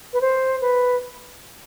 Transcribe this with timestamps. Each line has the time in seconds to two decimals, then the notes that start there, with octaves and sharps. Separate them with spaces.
0.13 B4
0.21 C5
0.61 B4